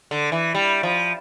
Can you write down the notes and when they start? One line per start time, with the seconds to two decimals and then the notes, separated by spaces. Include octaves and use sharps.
0.11 D3
0.32 E3
0.55 G3
0.83 F3